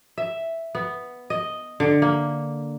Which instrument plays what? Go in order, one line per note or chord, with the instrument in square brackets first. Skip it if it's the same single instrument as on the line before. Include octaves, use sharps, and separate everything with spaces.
[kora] E5
B3
D#5
D3
A#3